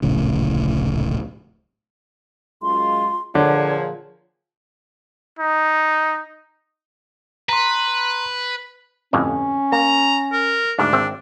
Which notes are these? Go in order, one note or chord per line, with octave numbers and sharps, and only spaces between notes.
D1 A#1 A2 C#3
F#2 G#3 F4 C6
A#2 D3 F3 G#4 C#5
D#4
B4 A#5 C6
G1 F2 A2 C#4
A#3 A#5
A#4
D2 G#2 D4
G#1 C4 E5